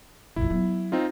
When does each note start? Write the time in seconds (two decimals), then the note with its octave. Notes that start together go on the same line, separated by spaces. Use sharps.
0.36 A#1 F2 E4
0.49 F#3 B3
0.92 C4 D#4 F4